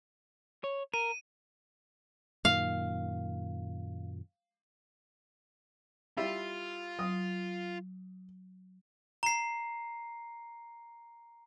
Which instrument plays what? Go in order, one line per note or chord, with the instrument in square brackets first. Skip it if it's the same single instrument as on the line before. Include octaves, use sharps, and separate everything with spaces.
[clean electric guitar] C#5
[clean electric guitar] A#4 [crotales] D#7
[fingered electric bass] F#2 A#2 D#3 [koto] F5
[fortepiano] G3 E4 [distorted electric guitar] F4
[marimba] F#3 [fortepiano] D#6
[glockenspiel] A#5 C7